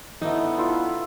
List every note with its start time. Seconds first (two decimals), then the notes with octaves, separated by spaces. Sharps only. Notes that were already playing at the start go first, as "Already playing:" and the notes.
0.22 D3 E3 A3 B3 D#4
0.57 E4 F4 A4